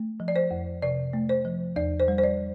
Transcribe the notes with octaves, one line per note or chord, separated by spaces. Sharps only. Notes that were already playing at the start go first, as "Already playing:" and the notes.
Already playing: A3
F3
D5
C5
F2
C3 D5
A3
C5
F3
E2 D5
C5
G3
C5
D5